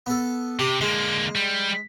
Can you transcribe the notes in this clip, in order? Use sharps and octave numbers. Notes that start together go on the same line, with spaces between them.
B3 A4
C3 G4
D3 G#3 A#3
G3